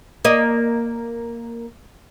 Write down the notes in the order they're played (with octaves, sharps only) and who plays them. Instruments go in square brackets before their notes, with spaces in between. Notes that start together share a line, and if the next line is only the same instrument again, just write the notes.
[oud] A#3 D#5